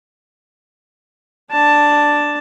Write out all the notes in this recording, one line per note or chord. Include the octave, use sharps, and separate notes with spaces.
D4 A5